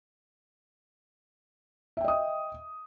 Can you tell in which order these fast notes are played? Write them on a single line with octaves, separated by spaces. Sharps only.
E5 G5 D#5 D#6